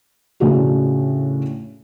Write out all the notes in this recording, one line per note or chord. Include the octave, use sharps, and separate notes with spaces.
A2 C#3 A3 D4 F4 F#4